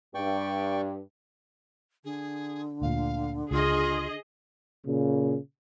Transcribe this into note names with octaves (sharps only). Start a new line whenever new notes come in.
G2 D5 G5 C#6
D3 G#4
D2 A#2 F5
C#2 F4 G#4 D#5
A#2 C#3